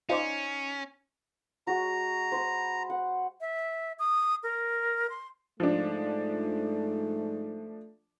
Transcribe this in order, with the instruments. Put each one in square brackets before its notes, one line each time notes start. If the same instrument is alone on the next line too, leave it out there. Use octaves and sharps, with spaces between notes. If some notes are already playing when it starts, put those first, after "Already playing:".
[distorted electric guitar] C#4 [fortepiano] D#4 [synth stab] F4 C5 D5
[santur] G#3 F#4 [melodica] A#5
[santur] C5 B5
F#5
[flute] E5
D#6
A#4
C6
[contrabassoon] G#2 [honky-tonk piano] F3 D4 [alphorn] A3